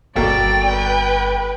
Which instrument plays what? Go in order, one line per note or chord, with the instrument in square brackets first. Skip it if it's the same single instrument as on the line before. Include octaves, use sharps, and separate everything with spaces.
[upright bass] G1 G3 [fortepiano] B2 A#3 A4 [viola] D5 [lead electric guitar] G5
[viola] B4